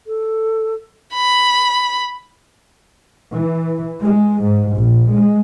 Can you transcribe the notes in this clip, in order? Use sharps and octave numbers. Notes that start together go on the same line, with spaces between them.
A4
B5
E3
G#3
G#2
A#1
G#3